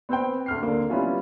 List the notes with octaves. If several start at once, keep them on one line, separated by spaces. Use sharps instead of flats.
B3 C4 C5 G5
D2 F6 C7
D3 A#3
G3 B3 C#4 E4 F4